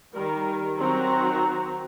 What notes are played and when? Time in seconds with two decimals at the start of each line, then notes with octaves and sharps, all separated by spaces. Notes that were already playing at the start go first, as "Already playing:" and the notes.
0.15 D#3 G3 A#4
0.79 D#3 F#3 C4 F#4 A#5